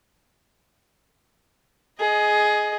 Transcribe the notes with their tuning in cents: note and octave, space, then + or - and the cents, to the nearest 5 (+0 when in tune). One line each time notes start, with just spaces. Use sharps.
G#4 +15 D#5 +0